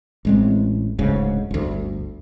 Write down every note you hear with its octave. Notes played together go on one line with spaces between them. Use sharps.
A1 G#3 C4
D1 D2 G#2 C#3
G1 D2